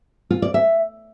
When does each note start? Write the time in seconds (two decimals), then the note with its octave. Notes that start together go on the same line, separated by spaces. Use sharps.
0.31 F4
0.42 D5
0.54 E5